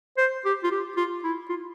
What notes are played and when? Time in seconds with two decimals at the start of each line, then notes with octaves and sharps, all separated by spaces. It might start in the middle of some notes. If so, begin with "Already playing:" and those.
0.17 C5
0.45 G4
0.63 F4
0.71 G4
0.97 F4
1.24 E4
1.49 F4